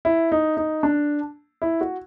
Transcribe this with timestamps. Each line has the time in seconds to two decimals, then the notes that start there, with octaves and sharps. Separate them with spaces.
0.05 E4
0.32 D#4
0.57 D#4
0.83 D4
1.62 E4
1.81 F#4